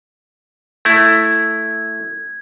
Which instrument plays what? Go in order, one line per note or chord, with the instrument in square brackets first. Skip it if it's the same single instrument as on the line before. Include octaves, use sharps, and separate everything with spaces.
[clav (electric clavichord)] A3 E4 [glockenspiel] G#6